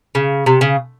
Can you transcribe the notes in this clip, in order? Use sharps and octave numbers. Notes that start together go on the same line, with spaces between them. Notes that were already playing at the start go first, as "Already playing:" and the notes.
C#3
C3
C#3